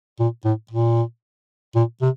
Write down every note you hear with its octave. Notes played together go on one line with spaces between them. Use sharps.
A#2
A2
A#2
A#2
C3